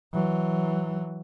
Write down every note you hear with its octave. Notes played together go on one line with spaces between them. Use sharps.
E3 F#3